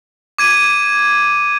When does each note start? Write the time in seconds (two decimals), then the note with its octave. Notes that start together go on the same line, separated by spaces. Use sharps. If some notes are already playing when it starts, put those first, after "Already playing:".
0.38 D6 G#6 D#7